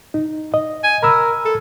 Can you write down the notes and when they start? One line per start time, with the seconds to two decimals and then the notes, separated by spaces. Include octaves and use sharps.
0.14 D#4
0.54 D#5
0.84 G#5
1.03 A#4 A#5 B5 E6
1.45 A4